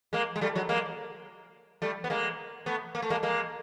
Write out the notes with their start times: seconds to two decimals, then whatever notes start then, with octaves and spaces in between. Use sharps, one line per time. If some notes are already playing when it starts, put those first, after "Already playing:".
0.13 G#3 A#3
0.36 G#3
0.41 G3 A3
0.55 F#3 G#3
0.69 G#3 A#3
1.82 G3 A3
2.04 B3
2.10 G#3 A#3
2.66 A3 B3
2.95 A#3
3.02 A3
3.10 G#3 A#3
3.23 G#3 A#3